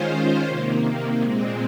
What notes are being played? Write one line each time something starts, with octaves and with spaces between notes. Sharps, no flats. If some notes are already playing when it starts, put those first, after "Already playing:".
Already playing: D#3 G#3 C#4 F4 C5
C3 D#3 A#3
A#2 G#3 C4